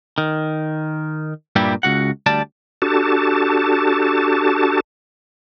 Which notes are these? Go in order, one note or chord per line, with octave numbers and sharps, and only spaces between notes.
D#3
G2 A#2 G3 E4 G4
C#2 F#4 F#5
D2 G3 D5 A5
D4 F#4 G4 A4 A5